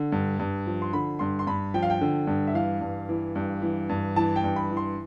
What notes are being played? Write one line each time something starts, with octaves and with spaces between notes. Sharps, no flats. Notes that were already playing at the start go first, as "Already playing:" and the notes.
Already playing: D3
G2
G2
F3
C6
D3 B5
G2 C6
C6
G2 B5
F3 G5
F5
G5
D3
G2
E5
E3 F5
G2
E3
G2
E3
G2
E3 A5
G5
G2
B5
E3
C6